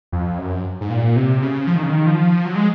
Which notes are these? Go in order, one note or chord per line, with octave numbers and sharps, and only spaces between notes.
F2
F#2
G#2
A#2
C3
C#3
F3
D#3
C#3
D#3
F3
F#3
G#3